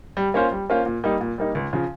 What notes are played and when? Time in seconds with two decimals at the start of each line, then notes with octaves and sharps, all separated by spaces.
0.17 G3
0.34 A#3 C#4 F4 C5
0.52 G3
0.70 A#3 C#4 F4 C5
0.86 A#2
1.04 G3 A#3 D#4
1.20 A#2
1.38 G3 A#3 D#4
1.55 C#2
1.73 C#3 F3